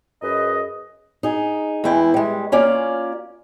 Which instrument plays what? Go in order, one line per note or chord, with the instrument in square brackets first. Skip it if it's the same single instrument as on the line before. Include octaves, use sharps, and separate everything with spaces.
[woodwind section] F#2 G#4 B4 D#5
[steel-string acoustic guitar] D#4 G#4
E2 E3 G#3 E4 G5
G3 G#3
A#3 C#4 F4 D5